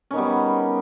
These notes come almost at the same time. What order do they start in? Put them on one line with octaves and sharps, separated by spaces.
C#4 D#3 B3 G3